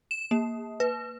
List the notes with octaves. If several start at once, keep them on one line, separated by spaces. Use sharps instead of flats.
E7
A#3
B4